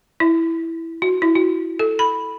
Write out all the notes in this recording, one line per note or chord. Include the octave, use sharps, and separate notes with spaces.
E4
F#4
E4
F#4
A4
B5